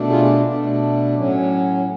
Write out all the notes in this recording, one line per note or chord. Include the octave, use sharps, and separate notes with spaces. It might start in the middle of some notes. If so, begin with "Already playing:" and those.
Already playing: B2 A3 D4
F4 G#4
B2 A3 D4
A2 F#3 C#4